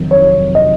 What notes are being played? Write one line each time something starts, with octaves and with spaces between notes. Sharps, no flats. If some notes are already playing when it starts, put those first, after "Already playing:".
Already playing: F2 C3 D#3 F#3
C#5
D#5